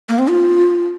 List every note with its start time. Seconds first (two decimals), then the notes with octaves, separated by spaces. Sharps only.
0.09 A#3
0.19 C4
0.28 F4